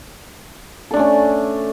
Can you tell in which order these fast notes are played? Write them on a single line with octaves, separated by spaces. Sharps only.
A4 D4 A3 C#4